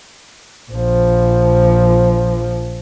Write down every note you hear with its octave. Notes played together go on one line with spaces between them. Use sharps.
A#1 F3